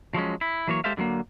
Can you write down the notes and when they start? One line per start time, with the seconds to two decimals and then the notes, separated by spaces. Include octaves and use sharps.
0.14 F3 F#3 G#3 C#4
0.41 E4
0.68 E3 F#3 A#3 C#5
0.84 G#3 G4 A4 C5 E5 F5
0.97 D3 F#3 G#3 A#3